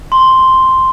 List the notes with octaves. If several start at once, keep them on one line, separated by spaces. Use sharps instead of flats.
C6